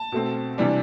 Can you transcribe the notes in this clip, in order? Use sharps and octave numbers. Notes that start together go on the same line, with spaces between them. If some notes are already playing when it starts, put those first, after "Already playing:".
Already playing: A5
B2 A3 C4
C3 E3 G3 D4